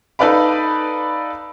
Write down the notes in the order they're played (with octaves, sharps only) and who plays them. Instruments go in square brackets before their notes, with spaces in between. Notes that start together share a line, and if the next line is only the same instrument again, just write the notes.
[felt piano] D#4 A4 B4 D5 F5 B5